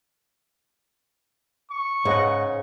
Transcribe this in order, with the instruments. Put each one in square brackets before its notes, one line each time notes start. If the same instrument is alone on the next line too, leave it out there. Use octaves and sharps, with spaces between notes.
[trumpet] C#6
[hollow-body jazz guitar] G#2 [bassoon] C#3 [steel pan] B4 D#5 F#5